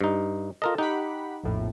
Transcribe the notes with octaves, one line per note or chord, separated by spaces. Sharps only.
G2 D#4
F4 A4 A#4 D#5
D#4 G4 F#5 B5
A#1 F2 A2